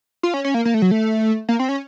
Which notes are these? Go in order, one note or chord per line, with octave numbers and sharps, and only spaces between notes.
F4
C#4
C#4
A#3
A#3
A3
F#3
A3
A#3
C4
C#4